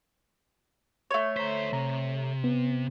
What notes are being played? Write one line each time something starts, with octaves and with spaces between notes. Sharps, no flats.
A3 C#5
D2 C5 A#5 B6
C3 A#5
B3